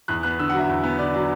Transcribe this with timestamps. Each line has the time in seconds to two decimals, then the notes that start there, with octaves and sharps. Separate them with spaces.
0.08 E2 F#6
0.23 B3 F#6
0.39 D3 E6
0.49 F#5
0.53 F#3
0.58 E5
0.69 E2
0.84 B3
0.99 D3 D5
1.14 F#3 D5